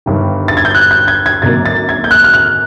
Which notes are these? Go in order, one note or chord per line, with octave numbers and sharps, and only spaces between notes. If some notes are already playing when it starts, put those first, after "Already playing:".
G1 G2 D#3
A6
G#6
G6
F#6
G6
G#6
G#6
G#1 F#2 D3 F#3 A#3 A6
A6
G#6
G6
F#6
F6
F#6